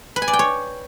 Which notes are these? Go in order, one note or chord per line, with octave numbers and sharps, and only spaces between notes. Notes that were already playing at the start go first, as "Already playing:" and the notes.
B4
G#5
D5
G5
C#5